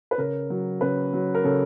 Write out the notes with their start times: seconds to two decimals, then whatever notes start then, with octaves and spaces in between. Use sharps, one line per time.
0.11 B4
0.18 C#3 A#4
0.50 F#3
0.81 C#3 B4
1.13 F#3
1.35 A#4
1.44 C#3 A4